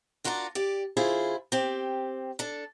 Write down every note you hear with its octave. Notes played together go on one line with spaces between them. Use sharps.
D4 F4 F#4 A#4 C5 D5
G4 D5
D3 E4 F4 G#4 C5
C4 G4
D4 A4